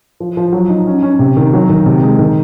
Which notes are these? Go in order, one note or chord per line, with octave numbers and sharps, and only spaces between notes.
F3
F3
F#3
D#4
C#4
C#4
C3
D#3
F#3
D#3
C3
G#3
D#3